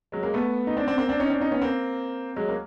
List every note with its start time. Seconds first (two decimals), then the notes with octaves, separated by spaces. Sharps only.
0.12 F#3 G#3
0.23 G#3 A#3
0.34 A3 B3
0.67 D#4
0.77 C4 D4
0.87 C4 D4
0.98 A#3 C4
1.09 C4 D4
1.20 C#4 D#4
1.30 C4 D4
1.40 C#4 D#4
1.51 B3 C#4
1.62 A#3 C4
2.36 F#3 G#3
2.49 A#3